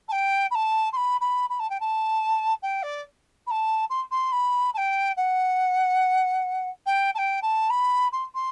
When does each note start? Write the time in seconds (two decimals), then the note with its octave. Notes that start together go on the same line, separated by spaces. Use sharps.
0.08 A5
0.12 G5
0.51 B5
0.55 A5
0.93 C6
0.96 B5
1.21 B5
1.50 B5
1.59 A5
1.70 G5
1.80 A5
2.62 G5
2.83 D5
3.47 B5
3.51 A5
3.90 C6
4.11 C6
4.32 B5
4.74 A5
4.77 G5
5.17 F#5
6.86 G5
7.15 A5
7.18 G5
7.42 A5
7.70 B5
8.12 C6
8.35 C6